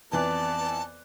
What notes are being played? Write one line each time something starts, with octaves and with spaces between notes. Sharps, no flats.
F2 E3 B3 D5 A5 F#6